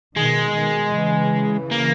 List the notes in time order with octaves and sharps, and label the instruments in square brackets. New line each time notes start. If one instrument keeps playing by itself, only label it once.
[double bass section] B2 D#3 [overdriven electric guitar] G#3
[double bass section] B2 D#3
C#3 E3
[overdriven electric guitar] A#3